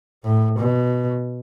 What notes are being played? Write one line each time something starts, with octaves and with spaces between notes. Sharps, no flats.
A2
B2